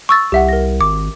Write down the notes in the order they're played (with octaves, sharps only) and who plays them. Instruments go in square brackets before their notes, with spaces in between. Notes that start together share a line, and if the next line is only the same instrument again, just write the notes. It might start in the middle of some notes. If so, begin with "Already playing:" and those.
[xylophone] C#6 E6 A6
[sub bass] C2 [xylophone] G4 E5 F#5
[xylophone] A#4 A#6
[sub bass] G#1 [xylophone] D6